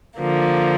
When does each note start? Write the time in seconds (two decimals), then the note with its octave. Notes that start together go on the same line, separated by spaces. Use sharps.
0.18 D3 F3 A#3